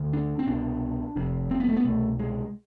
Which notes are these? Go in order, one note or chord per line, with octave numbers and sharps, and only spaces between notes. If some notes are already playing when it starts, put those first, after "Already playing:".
Already playing: D2 D3
D4
C4
C2 B2 D4
F1 F2 C3
C4
B3
A3
B3
C2 B2 A3
G#3